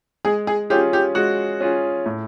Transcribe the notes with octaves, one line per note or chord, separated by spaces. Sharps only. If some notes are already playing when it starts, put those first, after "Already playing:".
G#3 G#4
G#4
C#4 F4 G4 G#4
G4
G#3 F#4
C#4 F4 G#4
A2